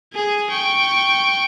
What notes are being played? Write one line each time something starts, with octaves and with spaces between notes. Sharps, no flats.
G#4 G#5
G5 C#6